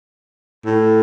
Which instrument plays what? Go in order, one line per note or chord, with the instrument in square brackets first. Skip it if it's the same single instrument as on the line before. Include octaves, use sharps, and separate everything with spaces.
[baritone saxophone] A2